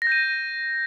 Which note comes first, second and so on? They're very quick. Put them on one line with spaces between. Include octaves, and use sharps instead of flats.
A#6 G6 D#7